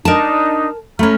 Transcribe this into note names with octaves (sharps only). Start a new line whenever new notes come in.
D4 D#4 A#4 A5
A3 C#4 A#5 B5 F6